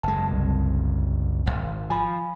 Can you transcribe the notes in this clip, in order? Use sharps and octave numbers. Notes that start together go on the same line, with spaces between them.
F#1 G#3 A5
C2
D1 G#1
F3 G#5 B5